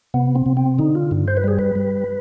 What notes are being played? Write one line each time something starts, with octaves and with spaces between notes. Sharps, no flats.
C3 B3
C4
C3
C4
D3 D#4
F4
G2
C5
B4
G3 G#4
B4
G3